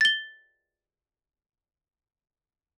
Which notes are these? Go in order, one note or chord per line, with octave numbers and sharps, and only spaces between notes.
A6 G7